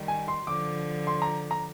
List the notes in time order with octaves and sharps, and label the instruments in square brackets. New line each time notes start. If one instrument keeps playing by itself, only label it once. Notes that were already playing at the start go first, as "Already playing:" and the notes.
Already playing: [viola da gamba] D#3 G3
[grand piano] G#5
C6
[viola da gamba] D3 F3 [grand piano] D6
[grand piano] C6
A#5
A#5